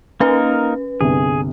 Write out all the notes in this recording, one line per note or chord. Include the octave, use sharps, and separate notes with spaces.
A#3 C#4 D#4 A#4 B4
G1 C2 G#4